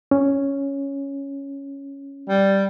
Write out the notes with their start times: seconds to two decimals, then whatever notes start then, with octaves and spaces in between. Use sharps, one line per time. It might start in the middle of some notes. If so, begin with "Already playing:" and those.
0.11 C#4
2.29 G3